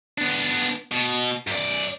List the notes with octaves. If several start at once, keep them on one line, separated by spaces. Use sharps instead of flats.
B3 D4
B2
F#2 D5